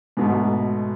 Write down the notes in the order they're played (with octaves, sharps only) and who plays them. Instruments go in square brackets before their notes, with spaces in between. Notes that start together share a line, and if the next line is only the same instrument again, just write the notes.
[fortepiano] G#2 B2 A3